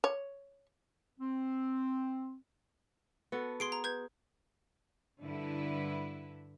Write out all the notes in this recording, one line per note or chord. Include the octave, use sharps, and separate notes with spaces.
C#5
C4
B3 F#4 A4
G#4 C6 C7 D7
A#5
B4 G6 G#6
G2 D3 E4 B4